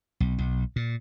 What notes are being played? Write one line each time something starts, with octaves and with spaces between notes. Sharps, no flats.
B1
B1
A#2